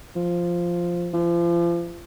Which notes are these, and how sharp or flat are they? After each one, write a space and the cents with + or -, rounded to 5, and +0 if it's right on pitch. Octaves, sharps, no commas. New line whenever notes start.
F3 -5
F3 -35